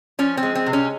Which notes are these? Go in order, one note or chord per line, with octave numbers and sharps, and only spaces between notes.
F3 C#4
C4
G#3
C4
C3
C#4